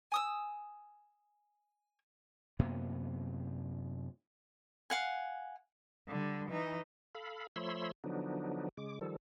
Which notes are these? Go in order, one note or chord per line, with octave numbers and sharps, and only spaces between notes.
G#5 D#6 E6
F#2 C3 A#3 B3
F5 F#5 G#5
D3 G3
E3 D#4
A4 F5 B5
F3 A3 C#5 B5 C6 E6
D3 F3 F#3 B3 D4 D#4
C#3 G#3 D6
D#3 F3 G3 A4